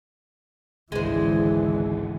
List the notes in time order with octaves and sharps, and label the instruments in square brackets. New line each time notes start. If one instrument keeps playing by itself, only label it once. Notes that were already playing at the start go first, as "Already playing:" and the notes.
[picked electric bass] G#1 C#2 [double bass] D3 E3 [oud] G#3 C5